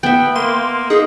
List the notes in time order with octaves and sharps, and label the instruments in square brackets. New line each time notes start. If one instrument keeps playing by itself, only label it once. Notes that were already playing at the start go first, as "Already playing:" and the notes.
[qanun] B3 E5 [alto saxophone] G5
[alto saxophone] A#3 [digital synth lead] C6
[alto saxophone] D#4 [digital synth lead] G#4